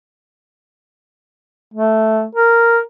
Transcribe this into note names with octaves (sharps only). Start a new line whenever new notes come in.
A3
A#4